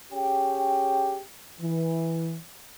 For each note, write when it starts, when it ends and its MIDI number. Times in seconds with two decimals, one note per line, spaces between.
0.12 1.22 61
0.12 1.22 67
0.12 1.22 68
0.12 1.22 79
1.60 2.36 52